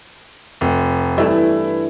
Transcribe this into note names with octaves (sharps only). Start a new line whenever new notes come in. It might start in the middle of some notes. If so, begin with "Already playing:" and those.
F1
G2 E3 A3 E4